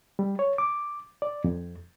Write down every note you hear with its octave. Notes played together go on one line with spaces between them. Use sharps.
G3
C#5
D6
D5
F2